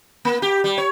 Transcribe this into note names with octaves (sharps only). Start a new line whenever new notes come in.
A#3
G4
G3
C#5